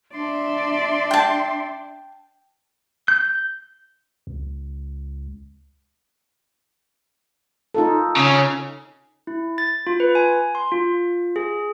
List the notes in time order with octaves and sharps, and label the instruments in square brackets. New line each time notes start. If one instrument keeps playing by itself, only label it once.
[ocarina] D4 [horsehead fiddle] D5 E5 [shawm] C6
[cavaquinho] G5 A5
[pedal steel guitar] G6
[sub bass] C#2
[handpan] D#4 F4 A4
[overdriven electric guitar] C#3 C#4
[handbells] E4
A6
F4
B4
G#5
C6
F4
G#4